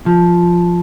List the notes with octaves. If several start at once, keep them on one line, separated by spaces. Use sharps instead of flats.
F3